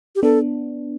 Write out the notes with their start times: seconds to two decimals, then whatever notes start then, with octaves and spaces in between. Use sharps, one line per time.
0.16 G4
0.23 B3 D4 A4